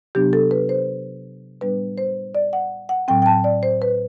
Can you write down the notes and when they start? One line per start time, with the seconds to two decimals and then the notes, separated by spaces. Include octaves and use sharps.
0.15 C3 F#3 B3 D4 G4
0.33 A4
0.51 B4
0.69 C5
1.61 A2 G3 B3 D4 B4
1.98 C5
2.35 D5
2.53 F#5
2.89 F#5
3.08 A2 F#3 C4 G5
3.22 G5
3.26 A5
3.44 D5
3.63 C5
3.82 B4